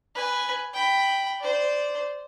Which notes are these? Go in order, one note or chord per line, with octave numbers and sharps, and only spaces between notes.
B4 G#5
G5 B5
C5 D5